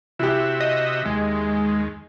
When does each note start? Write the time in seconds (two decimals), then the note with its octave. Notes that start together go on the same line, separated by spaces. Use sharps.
0.19 C3 E4 F#4 G4 E5
0.60 D#5
1.05 D#2 G#3